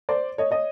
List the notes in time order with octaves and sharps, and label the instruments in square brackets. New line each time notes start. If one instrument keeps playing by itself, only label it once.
[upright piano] C5 D5
C#5 D#5
C#5 D#5